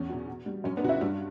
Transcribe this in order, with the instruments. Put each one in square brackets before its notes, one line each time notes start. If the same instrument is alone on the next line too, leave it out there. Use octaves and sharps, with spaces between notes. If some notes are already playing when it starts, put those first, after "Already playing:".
Already playing: [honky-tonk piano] E2 C#4
B2 F#3
B2
G3
F#2 C#4
B3 D4
C#3 F#3 F#4
C#4 E4
G2 D4 F#4